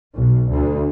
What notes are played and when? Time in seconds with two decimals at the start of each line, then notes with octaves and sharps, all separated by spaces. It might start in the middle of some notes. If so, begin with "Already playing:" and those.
0.16 B1
0.50 D2